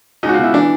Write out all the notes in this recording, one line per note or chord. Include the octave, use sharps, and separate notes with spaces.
C#2 D#4
F#4
F4
B2
E4
E3 D4